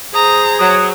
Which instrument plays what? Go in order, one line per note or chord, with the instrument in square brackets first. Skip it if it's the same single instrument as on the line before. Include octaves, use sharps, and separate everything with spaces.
[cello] G#4 C5 [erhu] A#5 [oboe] D#6
[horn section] F#3 [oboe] D#6